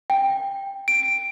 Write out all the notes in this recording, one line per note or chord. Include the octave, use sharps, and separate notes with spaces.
G5
D7